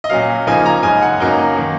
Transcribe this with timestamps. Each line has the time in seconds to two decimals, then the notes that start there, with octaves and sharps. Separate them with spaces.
0.04 D#5
0.10 A#2 F#3 C#4 F5
0.47 C#3 F3 A#3 D#4 G#5
0.66 A#5
0.83 F#2 C#3 G#3 D#4 G#5
1.02 F#5
1.20 F#2 C#3 F#3 A#3 D#4
1.56 D#3 A#3